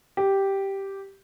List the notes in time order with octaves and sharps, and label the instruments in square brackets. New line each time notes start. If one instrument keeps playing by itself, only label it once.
[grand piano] G4